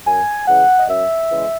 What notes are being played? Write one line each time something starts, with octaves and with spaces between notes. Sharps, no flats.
F#2 G#5
C#3 E3 G#3 F#5
D#5
F#2 E5
C#3 E3 G#3